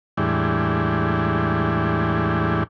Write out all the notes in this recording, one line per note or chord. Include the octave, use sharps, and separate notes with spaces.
E2 A2 E3 G3 G#3 D4